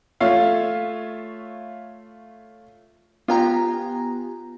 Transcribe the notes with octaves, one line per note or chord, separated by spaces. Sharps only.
A3 F4 C#5 E5 F5
B3 F4 G4 G#5 A#5